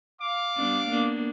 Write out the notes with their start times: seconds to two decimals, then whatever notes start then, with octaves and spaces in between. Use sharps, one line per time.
0.22 F5 D6
0.57 G3 B3 D4
0.89 A#3 B3 D4